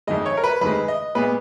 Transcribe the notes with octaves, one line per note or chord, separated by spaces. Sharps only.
F2 D#3 G#3 D#5
C#5
A#4
B4
F2 D#3 G#3 B4
D#5
A#2 G#3 B3 B4